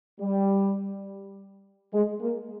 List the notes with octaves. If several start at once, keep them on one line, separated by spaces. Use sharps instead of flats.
G3
G#3
A#3